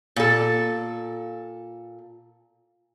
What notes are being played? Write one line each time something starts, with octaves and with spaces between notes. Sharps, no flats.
A#2 A4